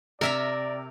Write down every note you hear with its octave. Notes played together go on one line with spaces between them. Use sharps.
C3 A#4 D5 E5 A#5